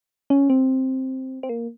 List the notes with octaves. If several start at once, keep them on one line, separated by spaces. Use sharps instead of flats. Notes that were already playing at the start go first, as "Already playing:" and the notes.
C#4
C4
C4
A#3